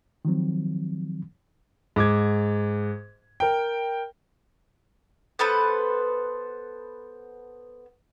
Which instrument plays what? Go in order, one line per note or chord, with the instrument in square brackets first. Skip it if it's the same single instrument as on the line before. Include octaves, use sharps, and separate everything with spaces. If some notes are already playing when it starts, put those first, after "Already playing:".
[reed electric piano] D#3 F3 F#3 C4
[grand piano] G#2 D6 G#6
A#4 G5
[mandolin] B3 A4 B4 C5